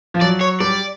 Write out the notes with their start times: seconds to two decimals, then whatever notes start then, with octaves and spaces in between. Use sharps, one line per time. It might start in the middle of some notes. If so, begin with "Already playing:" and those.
0.14 F3
0.21 F#3 D5
0.41 C#5
0.60 G3 D5